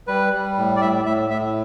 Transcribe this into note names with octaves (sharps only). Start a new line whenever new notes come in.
G3 B4
G3
A2
D5
A2 E5
A2 E5
A2 E5